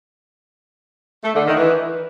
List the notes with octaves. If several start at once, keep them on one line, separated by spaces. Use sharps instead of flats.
A3
D3
D#3
E3